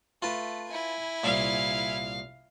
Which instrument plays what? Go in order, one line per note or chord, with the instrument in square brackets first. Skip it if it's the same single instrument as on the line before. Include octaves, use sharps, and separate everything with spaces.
[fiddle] A3 [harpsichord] F4 B4 A5
[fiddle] E4 G#5
[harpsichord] C2 A#2 [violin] F5